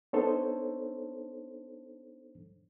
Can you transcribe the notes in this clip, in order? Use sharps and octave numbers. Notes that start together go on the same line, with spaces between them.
B3 D4 D#4 A4 C5 C#5